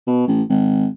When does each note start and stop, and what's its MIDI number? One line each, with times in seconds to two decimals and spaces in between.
0.07 0.25 47
0.28 0.42 33
0.49 0.87 32